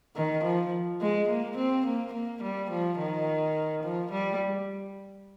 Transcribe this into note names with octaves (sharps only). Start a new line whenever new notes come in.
D#3
F3
G#3
A#3
C4
A#3
A#3
G3
F3
D#3
F3
G3